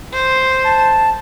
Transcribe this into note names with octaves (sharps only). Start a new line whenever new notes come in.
C5
A5